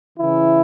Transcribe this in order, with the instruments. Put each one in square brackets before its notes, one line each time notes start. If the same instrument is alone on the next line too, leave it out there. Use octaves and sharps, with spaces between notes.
[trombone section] C#3 E3 E4